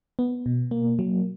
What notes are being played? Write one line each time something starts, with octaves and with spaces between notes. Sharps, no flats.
B3
B2
A#3
F#3